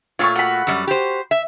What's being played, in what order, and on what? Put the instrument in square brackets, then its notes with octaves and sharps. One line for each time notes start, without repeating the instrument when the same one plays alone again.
[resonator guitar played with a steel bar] A#2 A3 F4 [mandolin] C#5 C6 C#6
[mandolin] F#4 B5
[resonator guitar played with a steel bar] F#2 G3
G4 C5
E5